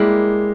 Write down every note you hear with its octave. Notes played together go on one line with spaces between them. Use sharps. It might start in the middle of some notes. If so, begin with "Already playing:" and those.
Already playing: G3 G#3 A#3 E4 G4